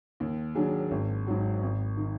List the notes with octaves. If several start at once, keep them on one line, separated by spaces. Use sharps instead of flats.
D#2
D#3 F#3 D4 G#4
G#1
G#2 F#3
G#1
D#3